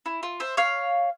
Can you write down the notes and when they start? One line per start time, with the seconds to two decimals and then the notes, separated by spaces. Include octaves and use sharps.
0.06 E4
0.23 F4
0.40 C5 E5
0.57 C#5 F5